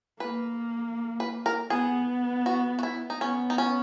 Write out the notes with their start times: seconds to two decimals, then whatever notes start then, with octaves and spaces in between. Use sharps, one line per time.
0.20 A#3 B4
1.20 B4
1.46 A#4
1.70 B3 G#4
2.46 F#4
2.79 F#4
2.83 E4
3.10 D#4
3.21 B3 C#4
3.50 D#4
3.58 C#4